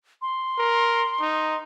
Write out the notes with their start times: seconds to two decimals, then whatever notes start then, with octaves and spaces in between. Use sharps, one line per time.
0.22 C6
0.58 A#4
1.20 D#4